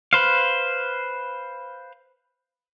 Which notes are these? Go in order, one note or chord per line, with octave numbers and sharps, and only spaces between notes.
B4 C5 F5